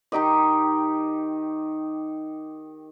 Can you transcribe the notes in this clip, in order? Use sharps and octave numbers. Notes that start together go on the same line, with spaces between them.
D#3 D#4 G4 D#5